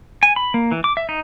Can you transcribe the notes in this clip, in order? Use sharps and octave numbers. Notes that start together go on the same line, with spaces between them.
G#5
B5
A#3
E3
D6
E5
D#4